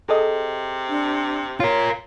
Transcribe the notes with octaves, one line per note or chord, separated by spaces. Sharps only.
C3 G#4 A4 D#5
D4
F4 A#4 C#5